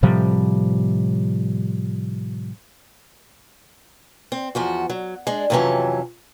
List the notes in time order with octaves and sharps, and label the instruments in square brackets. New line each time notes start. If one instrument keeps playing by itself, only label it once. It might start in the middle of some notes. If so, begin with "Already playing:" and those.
[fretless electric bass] A2 C3 F3 G3
[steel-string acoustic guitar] C4
E2 F3 F#4
F#3
G#3 D4
F2 C3 E3 F#3 C#4 A5